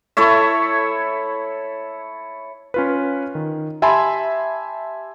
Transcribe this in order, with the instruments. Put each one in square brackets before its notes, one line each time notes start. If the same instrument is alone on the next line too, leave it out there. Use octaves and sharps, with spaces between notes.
[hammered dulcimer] E4 A4 C#5 E5
[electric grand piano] C#4 F4 B4
D#3
G4 E5 G#5 A5 B5 C6